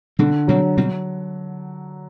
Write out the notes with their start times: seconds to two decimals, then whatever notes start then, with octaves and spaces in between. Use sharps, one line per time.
0.19 B2 D3 G3 C4
0.48 B2 F#3 G3 C4
0.77 B2 F#3 G3 C4